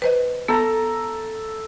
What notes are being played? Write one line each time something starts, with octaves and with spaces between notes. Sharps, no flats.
B4 C5 D#5
B3 A4 A#5